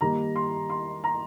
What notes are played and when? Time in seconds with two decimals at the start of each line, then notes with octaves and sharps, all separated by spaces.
0.01 D#3 G3 A#3 A#5
0.36 C6
0.70 C6
1.04 A#5